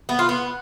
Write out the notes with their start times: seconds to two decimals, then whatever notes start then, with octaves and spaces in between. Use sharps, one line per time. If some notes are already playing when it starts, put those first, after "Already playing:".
0.09 B3
0.19 F4
0.29 B3